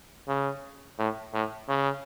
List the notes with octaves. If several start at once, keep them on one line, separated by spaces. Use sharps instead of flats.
C#3
A2
A2
C#3